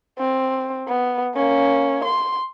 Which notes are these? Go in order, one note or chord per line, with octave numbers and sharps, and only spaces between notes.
C4
B3
A#3 C#4
C6